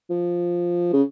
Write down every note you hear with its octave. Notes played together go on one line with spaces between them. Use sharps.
F3
C#3